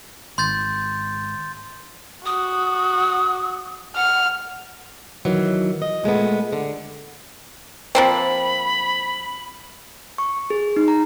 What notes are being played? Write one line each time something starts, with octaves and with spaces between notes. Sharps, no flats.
G#1 C6 G6 A6
F#4 D#6
F#5 F6
D#3 E3 F#3
D#5
A#2 G#3 A3 B3
D3
F3 A#3 C4 B5
C#6
G#4
D#4
A#5